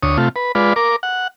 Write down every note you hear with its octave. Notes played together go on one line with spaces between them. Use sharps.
D2 C#5 D#6
C3 A3 F4
B4
G#3 F4 B4 D5
A#4 D6
F#5